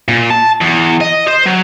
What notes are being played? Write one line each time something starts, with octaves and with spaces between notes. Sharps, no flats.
A#2
A5
E2
D#5
C5
F#3